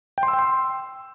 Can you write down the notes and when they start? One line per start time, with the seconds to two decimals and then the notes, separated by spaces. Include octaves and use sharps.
0.18 G5
0.23 C6
0.28 E6
0.33 G5
0.39 C6